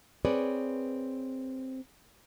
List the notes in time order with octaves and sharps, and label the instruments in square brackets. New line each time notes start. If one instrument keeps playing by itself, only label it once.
[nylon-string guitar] C4 G#4 B4 C#5 D5